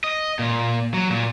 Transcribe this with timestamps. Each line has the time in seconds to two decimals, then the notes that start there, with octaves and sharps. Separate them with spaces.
0.04 D#5
0.39 A#2
0.94 F#3
1.10 A#2